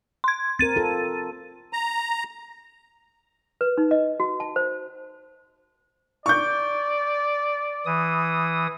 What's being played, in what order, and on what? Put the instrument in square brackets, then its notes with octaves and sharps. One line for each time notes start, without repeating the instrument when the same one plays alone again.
[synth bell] C6 G#6
[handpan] C4 A#4 [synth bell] A6 D#7
[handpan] F4 A4
[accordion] A#5
[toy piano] B4
D#4
D#5
F#4
A5
C5
[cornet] D5 [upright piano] C#6 G6
[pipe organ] E3 D#6